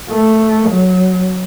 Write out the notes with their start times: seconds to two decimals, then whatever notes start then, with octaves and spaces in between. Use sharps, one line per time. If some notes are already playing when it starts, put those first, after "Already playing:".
0.10 A3
0.70 F#3